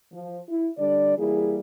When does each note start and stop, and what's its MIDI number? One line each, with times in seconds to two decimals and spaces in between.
0.12 0.39 53
0.49 0.69 64
0.78 1.13 50
0.78 1.13 55
0.78 1.13 62
0.78 1.13 74
1.18 1.59 52
1.18 1.59 55
1.18 1.59 58
1.18 1.59 64
1.18 1.59 68